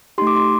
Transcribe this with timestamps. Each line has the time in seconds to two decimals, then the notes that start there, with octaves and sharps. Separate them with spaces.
0.18 A3 D#4 G4 C6
0.27 D6
0.36 C6